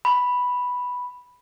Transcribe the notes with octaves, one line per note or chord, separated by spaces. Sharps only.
B5